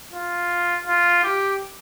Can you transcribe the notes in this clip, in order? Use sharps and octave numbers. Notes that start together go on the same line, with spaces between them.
F4
F4
G4